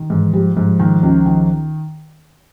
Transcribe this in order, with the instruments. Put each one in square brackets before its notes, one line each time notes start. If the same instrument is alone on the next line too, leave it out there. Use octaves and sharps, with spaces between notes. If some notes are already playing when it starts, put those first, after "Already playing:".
Already playing: [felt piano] D#3
[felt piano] G#2 [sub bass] E3
[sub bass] F3 [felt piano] G3
[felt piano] G#2 [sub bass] F3
[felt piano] D#3
C#2
D#3